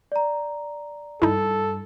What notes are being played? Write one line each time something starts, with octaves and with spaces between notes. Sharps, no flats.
D5 A#5
G2 D#4 E4 A4